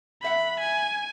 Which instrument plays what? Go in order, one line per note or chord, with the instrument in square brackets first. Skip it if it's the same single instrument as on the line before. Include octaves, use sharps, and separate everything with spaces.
[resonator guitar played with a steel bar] E2 E5 F#5 [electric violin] B5
[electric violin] G#5